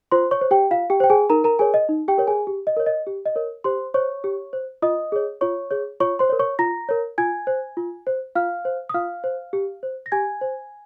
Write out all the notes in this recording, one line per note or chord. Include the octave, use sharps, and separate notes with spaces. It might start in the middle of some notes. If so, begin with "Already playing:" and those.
F4 C5 C6
C#5 C#6
C5
G4 G5
F4 F5
G4 G5
C5 G5
G#4 G#5
D#4 A#4 A#5
A#4 A#5
G#4 A#4 C#5 G#5
D#5
D#4
G4 G5
A#4 C#5
G#4 G#5
G4
D#5
A#4 C#5
D#5
G4
D#5
A#4 C#5
G4 C5 C6
C5 C#5 C#6
G4
C5
F4 D#5 D#6
G#4 C#5
F4 C#5 C#6
G#4 C#5
F4 C#5 C#6
C5 C6
C#5
A#4
C#5 C#6
F4 A#5 A#6
A#4 C#5
F4 G#5 G#6
C5
F4
C5
F4 F5 F6
C5
D#6
F4 F5 F6
C5
G4
C5
A#6
G4 G#5 G#6
C5